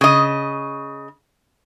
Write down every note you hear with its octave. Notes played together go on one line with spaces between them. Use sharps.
C#3 D#5